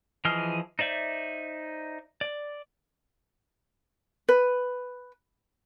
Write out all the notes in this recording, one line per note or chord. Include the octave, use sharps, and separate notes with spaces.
E3 F3 G#4 D#5 F6
D#4 C5 D5 E5
D5
B4